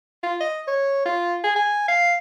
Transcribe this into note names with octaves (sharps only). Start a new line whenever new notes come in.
F4
D#5
C#5
F4
G#4
G#5
F5